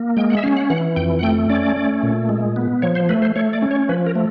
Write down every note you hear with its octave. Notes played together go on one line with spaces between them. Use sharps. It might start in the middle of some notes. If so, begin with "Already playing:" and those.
Already playing: A#3
G#3 G5
F#5
E5
C#4 F5
F#5
E3 F#5
F2 G5
F#5
A3 G5
C#4 D5
A3
A#2
G#3
B3
F3 C#5
C5
A3 B4
C5
A3 C#5
D5
C#4
C#5
F3 B4
A#4
A3